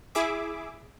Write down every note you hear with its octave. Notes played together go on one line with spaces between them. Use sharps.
E4 G#4 E5 D6